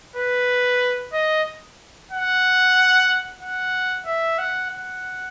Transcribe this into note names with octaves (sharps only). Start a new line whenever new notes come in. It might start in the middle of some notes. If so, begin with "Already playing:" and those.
B4
D#5
F#5
F#5
E5
F#5
F#5